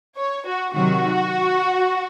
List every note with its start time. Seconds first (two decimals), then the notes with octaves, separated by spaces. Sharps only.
0.17 C#5
0.46 F#4
0.75 C3 D#3 F#3 F#4